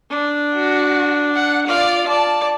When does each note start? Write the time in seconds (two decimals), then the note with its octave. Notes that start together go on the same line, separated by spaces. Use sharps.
0.10 D4
0.55 F#4
1.35 F#5
1.67 F4 D5 F5
2.08 D5 A5